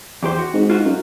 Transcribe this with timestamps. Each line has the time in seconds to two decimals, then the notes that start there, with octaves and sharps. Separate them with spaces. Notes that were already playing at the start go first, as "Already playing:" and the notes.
0.23 E2 G4 C5
0.39 F#4
0.54 G#2
0.70 F4 F#4
0.86 F#2